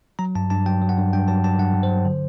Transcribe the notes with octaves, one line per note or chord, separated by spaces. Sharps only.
F#3 A#5
G2 A5
G2 A5
F#3 G5
F#3
F#5
G2
G2 G5
F#3 A5
F#3 A5
G2 F#5
G2
C5
F#3
D3